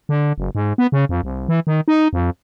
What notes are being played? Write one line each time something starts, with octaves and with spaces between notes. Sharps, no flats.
D3
F#1
G#2
B3
C#3
F2
C2
E3
D#3
D#4
F2